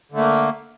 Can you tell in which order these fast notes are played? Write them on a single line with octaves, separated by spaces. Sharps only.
D3 A3 A#3